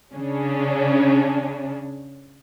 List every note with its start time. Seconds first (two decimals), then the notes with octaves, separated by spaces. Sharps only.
0.14 C#3 C#4 D4